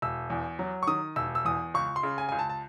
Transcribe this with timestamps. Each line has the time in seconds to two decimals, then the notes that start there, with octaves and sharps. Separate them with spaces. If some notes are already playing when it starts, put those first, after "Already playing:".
0.02 E1 E6
0.30 E2
0.59 F#3
0.83 C#6
0.87 D#3 D#6
1.16 E1 E6
1.35 E6
1.45 E2 D#6
1.74 C#2 C#6
1.96 C6
2.03 C#3
2.18 G#5
2.29 C#2 G#5
2.39 A5
2.49 A5